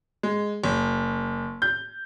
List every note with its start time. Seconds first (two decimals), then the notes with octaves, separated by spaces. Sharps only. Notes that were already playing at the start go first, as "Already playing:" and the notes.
0.23 G#3
0.64 F#1
1.62 G6